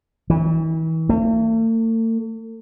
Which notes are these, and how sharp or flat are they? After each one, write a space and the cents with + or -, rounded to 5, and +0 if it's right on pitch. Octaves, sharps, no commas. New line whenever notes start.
E3 -35
A3 +45